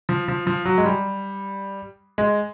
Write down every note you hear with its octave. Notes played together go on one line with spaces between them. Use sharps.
F3
F3
F3
F#3
G#3
G3
G#3